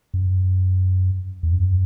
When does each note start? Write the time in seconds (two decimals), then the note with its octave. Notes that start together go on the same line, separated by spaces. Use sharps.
0.14 F#2
1.43 E2
1.53 F#2